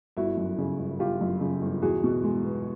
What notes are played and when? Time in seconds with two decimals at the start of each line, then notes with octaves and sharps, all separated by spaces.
0.17 G1 E4 F#4
0.37 F#2
0.58 C#3
0.79 G1
0.99 G1 F4 G4
1.21 F#2
1.41 C#3
1.62 G1
1.82 E2 F#4 G#4
2.04 B2
2.24 G#3
2.45 B3